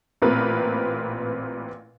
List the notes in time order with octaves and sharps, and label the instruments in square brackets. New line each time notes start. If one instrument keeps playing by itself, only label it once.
[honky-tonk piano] A1 A#2 C4 A#4 B4